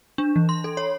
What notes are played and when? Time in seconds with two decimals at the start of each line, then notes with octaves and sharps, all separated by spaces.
0.18 D4
0.36 E3
0.49 C6
0.64 A4
0.77 C#5